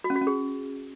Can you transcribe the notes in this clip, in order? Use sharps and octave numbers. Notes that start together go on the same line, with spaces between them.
F#4
C#4
F#4
C#4
G#4